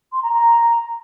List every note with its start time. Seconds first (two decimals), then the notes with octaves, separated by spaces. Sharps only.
0.12 C6
0.22 A#5
0.33 A#5